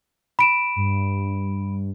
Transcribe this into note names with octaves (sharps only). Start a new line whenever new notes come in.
B5 D7 E7
G2